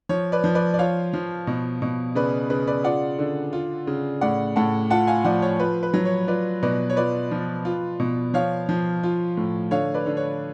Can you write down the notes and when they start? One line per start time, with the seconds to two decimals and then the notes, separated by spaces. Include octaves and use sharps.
0.09 F3 C#5
0.32 B4 D5
0.44 F3
0.55 B4 D5
0.74 D5
0.79 F4 C#5 F5
1.13 F3
1.47 B2
1.82 B2
2.15 C#3 B4 D5
2.50 C#3 B4
2.67 B4 D5
2.84 F4 D5 F#5
3.19 D3
3.53 F4
3.87 C#3
4.21 A2 D5 F#5
4.56 A2 F#5 A5
4.90 F4 F#5 A5
5.07 F5 G#5
5.24 F3 D5 F#5
5.42 C#5
5.59 F4 B4
5.83 B4
5.94 F#3
6.05 C#5
6.28 F4 B4 D5
6.63 B2 B4 D5
6.90 C#5
6.96 F4 B4 D5
7.31 F3
7.65 F4
8.00 B2
8.34 F3 C#5 F5
8.69 F3
9.03 F4
9.37 A2
9.71 D3 C#5 F5
9.94 B4 D5
10.06 D3
10.17 C#5